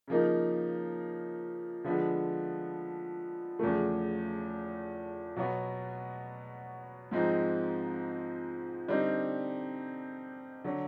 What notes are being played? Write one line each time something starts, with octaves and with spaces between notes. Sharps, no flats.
C#3 F3 A#3 D#4
D3 F3 G#3 B3
E2 C#3 F3 A3
B2 F#3 B3
G#2 F3 G#3 C4 D#4
D3 G3 C4 D#4
D3 F#3